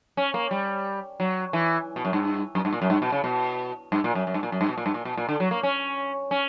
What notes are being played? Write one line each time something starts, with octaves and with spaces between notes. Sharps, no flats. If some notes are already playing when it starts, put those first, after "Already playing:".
C#4
A#3
G3
F#3
E3
B2
F#2
G2
F#2
G2
A#2
F#2
G2
B2
C#3
B2
G2
A#2
F#2
F#2
G2
A#2
F#2
G2
B2
A#2
G2
A#2
B2
A#2
D3
F#3
A#3
C#4
C#4